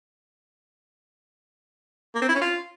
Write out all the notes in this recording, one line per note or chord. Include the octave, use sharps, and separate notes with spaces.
A#3
C4
E4
C#4
F4